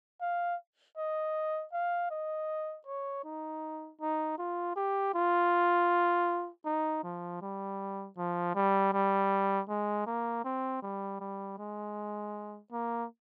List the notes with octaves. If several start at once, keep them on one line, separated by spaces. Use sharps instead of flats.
F5
D#5
F5
D#5
C#5
D#4
D#4
F4
G4
F4
D#4
F3
G3
F3
G3
G3
G#3
A#3
C4
G3
G3
G#3
A#3